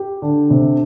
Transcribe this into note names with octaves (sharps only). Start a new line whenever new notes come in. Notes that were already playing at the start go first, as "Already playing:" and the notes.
Already playing: G4
D3
C3